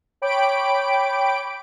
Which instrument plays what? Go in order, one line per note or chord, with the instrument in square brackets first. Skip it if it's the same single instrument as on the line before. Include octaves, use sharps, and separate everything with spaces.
[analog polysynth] C#5 G5 B5 D6 D7